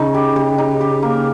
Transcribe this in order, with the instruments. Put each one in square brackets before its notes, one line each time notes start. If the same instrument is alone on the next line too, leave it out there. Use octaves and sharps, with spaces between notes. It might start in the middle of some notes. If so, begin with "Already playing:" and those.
Already playing: [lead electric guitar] C#3 [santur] D#4
[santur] G4
G4
D#4
G4
A#3